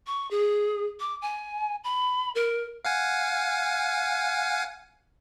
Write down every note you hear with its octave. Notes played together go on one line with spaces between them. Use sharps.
C#6
G#4
D6
G#5
B5
A#4
F5 F#5 G#5